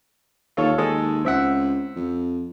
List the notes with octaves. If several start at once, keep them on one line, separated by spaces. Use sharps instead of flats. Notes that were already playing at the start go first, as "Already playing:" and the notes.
D#2 F4 A4 C#5
D#2 G#3 A4 D#6
C#2 C4 E5 F#5
F2